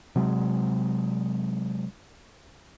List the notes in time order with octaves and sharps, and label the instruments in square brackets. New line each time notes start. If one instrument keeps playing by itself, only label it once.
[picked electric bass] C3 F#3 G#3